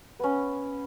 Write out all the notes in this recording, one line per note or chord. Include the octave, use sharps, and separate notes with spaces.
B3 C#4